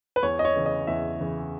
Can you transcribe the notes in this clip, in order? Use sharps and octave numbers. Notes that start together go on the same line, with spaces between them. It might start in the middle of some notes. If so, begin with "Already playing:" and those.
B4
E2 C#5
D#5
C#5
C#3 E3
D#5
E2 E5
C#3 E3